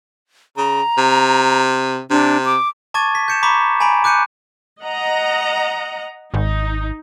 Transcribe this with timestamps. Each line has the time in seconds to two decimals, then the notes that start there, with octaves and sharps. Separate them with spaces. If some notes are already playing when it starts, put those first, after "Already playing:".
0.57 C#3 A#5
0.98 C3
2.10 C3 D4
2.45 D6
2.94 A5 C#6 D6 G#6 A6 D#7
3.15 B6
3.28 G6 C#7 E7
3.43 A#5 B5 C#6 D6 B6 E7
3.80 G#5 A#5 B5 D7
4.04 D6 F#6 G6 C#7 D#7
4.82 D#5 F#5 A#5
6.34 G#1 D#4